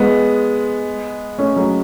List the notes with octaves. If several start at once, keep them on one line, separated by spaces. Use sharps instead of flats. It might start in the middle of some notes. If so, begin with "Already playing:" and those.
Already playing: G#3 B3
A3 C#4
F#3 A3